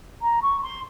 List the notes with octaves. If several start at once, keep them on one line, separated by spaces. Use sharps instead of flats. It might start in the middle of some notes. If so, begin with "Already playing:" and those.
A#5
C#6
C6